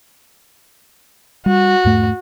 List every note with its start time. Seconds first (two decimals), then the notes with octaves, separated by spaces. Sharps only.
1.46 G3 F#4
1.85 E2 G#2 A3